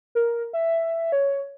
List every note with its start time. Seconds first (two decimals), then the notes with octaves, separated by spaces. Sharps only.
0.15 A#4
0.53 E5
1.12 C#5